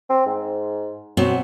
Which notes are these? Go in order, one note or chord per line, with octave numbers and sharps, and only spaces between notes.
C4
G#2
B2 F#3 C4